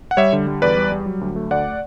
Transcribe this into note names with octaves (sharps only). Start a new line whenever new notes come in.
F#5
G3 C#5 E5
D3
G3
E2 B4 D5
G3
G3
F#3
D2
A3
D2 D5 F#5